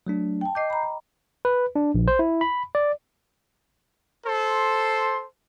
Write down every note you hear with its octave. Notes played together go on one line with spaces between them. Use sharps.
F#3 A3 D4
G5 A5
D#5 D6 G6 C7
A#5 B5
B4
D4
A#1
C5
E4
B5
D5
A4 C5 C6